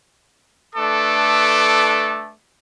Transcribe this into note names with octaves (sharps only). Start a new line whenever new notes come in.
A3 D4 A4 B4 D6